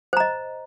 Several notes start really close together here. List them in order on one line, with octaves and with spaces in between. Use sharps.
C5 A#5 D#5